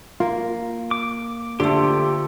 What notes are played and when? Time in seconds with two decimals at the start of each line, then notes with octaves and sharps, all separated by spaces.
0.20 A#3 F4
0.91 D6
1.60 D3 F3 A3 G4